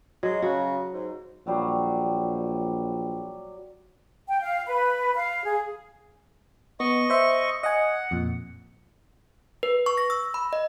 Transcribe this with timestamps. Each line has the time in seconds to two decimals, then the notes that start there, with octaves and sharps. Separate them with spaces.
0.23 F#3 G#3
0.42 C#3 F#4
0.93 G#2
1.46 A#1 F#3 G3 F5
4.28 G5
4.42 F5
4.67 B4
5.14 F5
5.44 G#4
6.80 B3 D#5 C#6
7.10 C5 E5
7.63 D#5 F#5 G#5
8.11 F2 A#2
9.63 B4
9.86 C#6
9.98 A#6
10.10 E6
10.34 B5
10.53 D#5